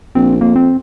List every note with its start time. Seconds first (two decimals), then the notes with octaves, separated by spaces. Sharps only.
0.15 A#1 C4
0.41 F2 A#3
0.56 C4